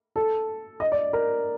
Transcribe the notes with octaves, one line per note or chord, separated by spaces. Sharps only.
A4
D#5
D5
A#4